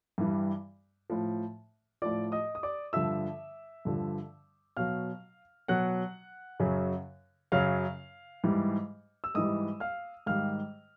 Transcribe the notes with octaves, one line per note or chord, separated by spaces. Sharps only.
G2 E3 G3
A2 F3
A2 F3 D5 D6
D#5 D#6
D#6
D5 D6
G2 D3 F3 E5 E6
G2 D3 F3
B2 F#3 F5 F6
B2 F#3 F#5 F#6
F#2 C#3 F#3
F#2 C#3 F#3 F5 F6
G#2 E3 G3
E6
G#2 E3 G3 D#5 D#6
F5 F6
G#2 D#3 G3 F5 F6